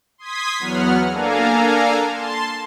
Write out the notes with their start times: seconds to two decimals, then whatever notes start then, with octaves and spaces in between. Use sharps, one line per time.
0.18 C6 D#6 G#6 B6
0.59 E2 F#3 B3 F#5 F6
1.11 A#3 D4 A4 F5 G#5 A#5
2.11 A5 C6